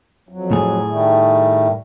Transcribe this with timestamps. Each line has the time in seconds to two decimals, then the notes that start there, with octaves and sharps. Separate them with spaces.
0.29 F2 F#3
0.51 A2 G#4
0.88 D#3 G3 A3